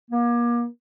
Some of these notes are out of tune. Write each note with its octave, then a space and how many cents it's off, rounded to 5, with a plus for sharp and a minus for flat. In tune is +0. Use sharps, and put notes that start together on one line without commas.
A#3 +35